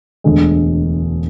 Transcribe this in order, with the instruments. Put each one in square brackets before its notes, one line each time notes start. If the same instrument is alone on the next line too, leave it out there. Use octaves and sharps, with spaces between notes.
[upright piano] E1 D2 D3 G#3